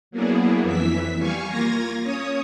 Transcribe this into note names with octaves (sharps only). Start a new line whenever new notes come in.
F#3 A#3 B3 D4 E4 G#4
F2 E3 E5 B6
G3 F5 G#5 C#6
A#3 F4 G#6 A#6
C#4 C#5 D#6